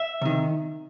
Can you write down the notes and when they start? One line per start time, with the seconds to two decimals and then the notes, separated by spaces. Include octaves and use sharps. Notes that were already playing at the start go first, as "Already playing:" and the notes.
Already playing: E5
0.22 C3 D#3